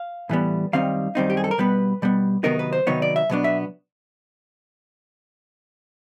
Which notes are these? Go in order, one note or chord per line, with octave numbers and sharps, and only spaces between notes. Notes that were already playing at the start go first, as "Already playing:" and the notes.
Already playing: F5
A2 E3 G3 B3
F#2 D#3 G3 C4 D#4 F5
F#2 D#3 G3 C4 D#4
G4
G#4
A4
A#4
B2 G3 B3 B4
B2 G3 B3
C3 D#3 F#3 B3 D#4 A#4
B4
C5
C3 D#3 F#3 B3 D#4 C#5
D5
E5
B2 F#3 B3 D4
E5